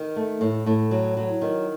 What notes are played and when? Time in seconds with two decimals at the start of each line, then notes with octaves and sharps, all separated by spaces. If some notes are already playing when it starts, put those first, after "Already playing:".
Already playing: D#3
0.16 A3
0.41 A2
0.66 A2
0.91 F#3
1.17 F#3
1.41 D#3